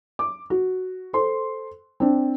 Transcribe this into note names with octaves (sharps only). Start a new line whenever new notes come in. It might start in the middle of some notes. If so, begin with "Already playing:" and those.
D6
F#4
A4 C5 C6
C4 D4